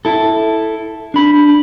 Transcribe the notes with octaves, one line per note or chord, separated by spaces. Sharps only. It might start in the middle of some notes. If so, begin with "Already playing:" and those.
E4 A4
D4 B5